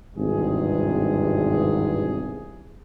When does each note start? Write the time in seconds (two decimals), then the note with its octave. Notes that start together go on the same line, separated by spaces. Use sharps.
0.17 G#1 E2 G2 C3 G#4